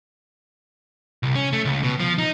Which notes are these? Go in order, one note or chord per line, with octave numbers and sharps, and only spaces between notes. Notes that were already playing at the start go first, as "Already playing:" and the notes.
C2
C#4
A3
C#2
B2
F3
D#4